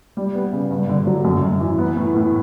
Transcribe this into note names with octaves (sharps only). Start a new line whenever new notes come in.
G3
B3
C#3
G2
D3
F#3
F#2
F#2
E3
B3
A2
A2